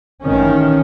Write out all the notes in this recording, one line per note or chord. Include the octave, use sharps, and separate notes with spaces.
A1 D#3 C#4